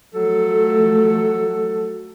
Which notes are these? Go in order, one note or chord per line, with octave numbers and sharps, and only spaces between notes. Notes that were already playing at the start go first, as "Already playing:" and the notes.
F3 F#3 A3 A4